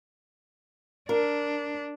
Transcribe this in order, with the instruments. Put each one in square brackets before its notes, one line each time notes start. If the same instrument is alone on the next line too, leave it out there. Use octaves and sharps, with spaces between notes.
[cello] D4 [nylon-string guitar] A#4